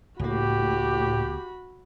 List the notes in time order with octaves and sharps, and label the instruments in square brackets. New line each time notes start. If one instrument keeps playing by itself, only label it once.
[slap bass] C#2 A#3 [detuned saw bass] A2 [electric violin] F#4 B5 [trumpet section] G4